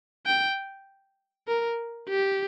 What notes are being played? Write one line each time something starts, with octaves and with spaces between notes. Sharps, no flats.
G5
A#4
G4